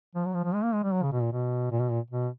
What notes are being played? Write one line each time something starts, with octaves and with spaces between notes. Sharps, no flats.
F3
F#3
F3
F3
G#3
A#3
G#3
G3
F#3
C#3
B2
A#2
B2
A#2
B2
A#2
B2